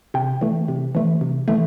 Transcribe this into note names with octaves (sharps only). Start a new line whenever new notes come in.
C3 G5
E3 A3
C3
E3 A3
C3
E3 A3